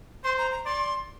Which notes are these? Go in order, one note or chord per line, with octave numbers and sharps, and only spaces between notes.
C5 C6
A#5
A#5
D5 C6